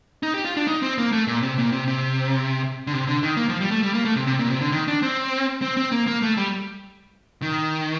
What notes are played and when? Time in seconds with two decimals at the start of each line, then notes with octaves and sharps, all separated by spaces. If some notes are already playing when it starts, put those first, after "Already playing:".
0.23 D#4
0.34 G4
0.45 F4
0.57 D4
0.67 D#4
0.82 C4
0.98 A#3
1.12 A3
1.27 A#2
1.42 C3
1.58 A#2
1.72 C3
1.88 C3
2.87 D3
2.93 C3
3.07 D3
3.23 D#3
3.37 A#3
3.49 F3
3.60 G3
3.71 A3
3.83 G3
3.94 A#3
4.05 A3
4.16 C3
4.27 C3
4.39 A#2
4.50 C3
4.61 D3
4.72 D#3
4.88 D4
5.02 C4
5.62 C4
5.77 C4
5.92 A#3
6.07 A#3
6.22 A3
6.37 G3
7.42 D#3